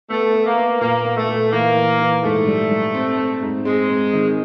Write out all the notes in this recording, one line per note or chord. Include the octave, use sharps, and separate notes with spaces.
A3 B3
B3
A#3
B3
A#2 A#3
B3
A3
A#2
E3 A#3
E3
E3
G#2 A3
G3
G3
C4
C4
G#2
G#3 C4
C4
D#3